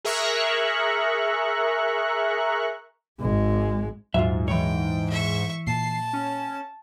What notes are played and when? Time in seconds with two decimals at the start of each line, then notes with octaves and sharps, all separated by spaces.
0.05 G#4 A#4 E5 A#5 C#6 F#6
3.20 G#1 G#3
4.14 D#1 G#2 F#3 F4 E5
4.48 E3 C#5 G5
5.10 E5 C#6
5.67 A#2 A5 C7
6.13 C#4